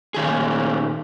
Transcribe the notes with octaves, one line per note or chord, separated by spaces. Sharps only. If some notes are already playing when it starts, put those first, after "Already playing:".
A#2 D#3 G#4